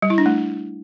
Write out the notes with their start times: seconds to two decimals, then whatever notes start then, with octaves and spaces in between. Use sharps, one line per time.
0.02 G3
0.10 E4
0.18 D4
0.26 A3